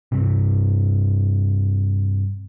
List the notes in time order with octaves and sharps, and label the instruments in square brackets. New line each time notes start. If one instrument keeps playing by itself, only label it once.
[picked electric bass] G2 C3